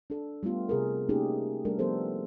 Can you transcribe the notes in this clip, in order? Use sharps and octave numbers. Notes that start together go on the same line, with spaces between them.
D4 A4
G3 A3 B3 F4 G4
C3 G#4 A#4
A3 A#3 C#4 D#4 G4 G#4
G3 A3 D4 A4 A#4
F3 B3 G4 A4 A#4 C5